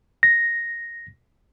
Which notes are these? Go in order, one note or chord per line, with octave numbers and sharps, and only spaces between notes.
A#6